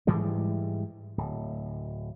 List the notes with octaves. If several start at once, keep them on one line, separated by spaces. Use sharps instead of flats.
G#2 E3 G3 G#3
D1